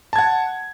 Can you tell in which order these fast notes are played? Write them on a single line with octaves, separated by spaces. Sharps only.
A5 G#6 F#5